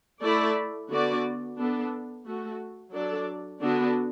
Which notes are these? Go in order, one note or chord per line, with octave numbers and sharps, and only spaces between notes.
A3 E4 A4 D5
D3 B3 F#4 D5
B3 D4 A4
A3 F#4 A4
F#3 D4 A4 D5
D3 B3 D4 F#4 A4